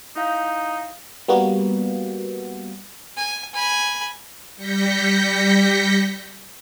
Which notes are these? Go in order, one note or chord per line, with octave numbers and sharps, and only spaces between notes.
D#4 E4 F5 G6
G3 A#3 B3 F#4
G#5
G#5 B5
G3 G6 A#6 B6 C#7